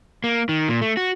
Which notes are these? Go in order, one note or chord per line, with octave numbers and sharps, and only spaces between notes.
A#3
D#3
A#2
A3
F#4